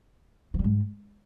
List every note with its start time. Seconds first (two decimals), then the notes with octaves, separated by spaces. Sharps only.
0.54 E3
0.59 G3
0.64 G#2